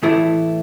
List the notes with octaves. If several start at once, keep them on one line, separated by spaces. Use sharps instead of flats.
A2 E3 A3 E4